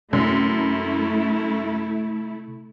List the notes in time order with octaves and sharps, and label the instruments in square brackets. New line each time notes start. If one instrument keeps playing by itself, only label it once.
[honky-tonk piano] F#2 [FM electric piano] C3 [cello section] A3 E4